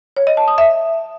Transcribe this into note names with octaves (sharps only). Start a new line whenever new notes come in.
C#5
D#5
A5
D#6
E5